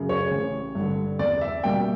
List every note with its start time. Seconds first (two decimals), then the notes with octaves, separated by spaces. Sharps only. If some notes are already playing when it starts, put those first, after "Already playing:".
Already playing: F#2 C#3
0.09 C#5
0.31 A1
0.75 G2 D3
1.19 E2 D5
1.41 E5
1.63 B2 G3 A#3 G5